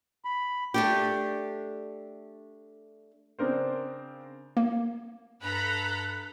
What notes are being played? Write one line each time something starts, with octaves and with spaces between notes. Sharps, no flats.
B5
A3 D4 G4
C#3 C4 D4 A#4 C5
A#3
G2 A4 A#5 B5 F#6